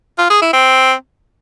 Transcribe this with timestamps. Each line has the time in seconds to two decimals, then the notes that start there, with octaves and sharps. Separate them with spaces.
0.18 F4
0.30 G#4
0.42 E4
0.53 C4